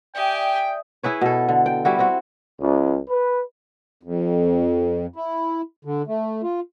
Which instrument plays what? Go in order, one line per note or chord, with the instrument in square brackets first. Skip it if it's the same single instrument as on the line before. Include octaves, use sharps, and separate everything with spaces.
[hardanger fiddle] G4 G#5 [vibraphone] D5 E5 D#6 [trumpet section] G5
[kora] E4 G#4 B4 C#5
B2 A4
D3
G5
G3 E4 F#4
C4 F#4
[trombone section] C#2
B4
[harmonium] F2
E4
D3
A3
F4